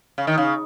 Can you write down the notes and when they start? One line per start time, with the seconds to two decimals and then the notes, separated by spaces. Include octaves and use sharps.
0.18 C#3
0.27 D#3
0.38 C#3